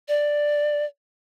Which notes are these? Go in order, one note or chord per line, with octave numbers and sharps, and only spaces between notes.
D5